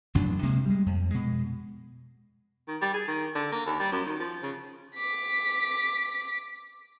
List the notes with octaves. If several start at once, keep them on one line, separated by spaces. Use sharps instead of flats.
A1 F#2 F#3 D4
D2 C3 G#3 A#3
G3 G#3
F2
B2 G#3
D#3
G3
G#4
D#3
D3
A#3
D#2
G3
F#2
D#3
F3
C#3
D6 B6